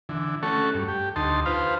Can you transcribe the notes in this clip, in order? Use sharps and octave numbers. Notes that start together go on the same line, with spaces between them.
D3 E3
A3 C#4 F#4 A4 C#6
G2
G4
D2 D#4 A5 C6
F4 B4 C5 F5